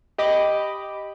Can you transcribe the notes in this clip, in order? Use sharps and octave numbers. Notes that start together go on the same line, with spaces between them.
G4 D#5 B5 D6